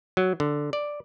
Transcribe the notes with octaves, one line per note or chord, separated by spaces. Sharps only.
F#3
D3
D5